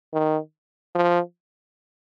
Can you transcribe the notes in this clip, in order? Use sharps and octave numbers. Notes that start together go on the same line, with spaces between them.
D#3
F3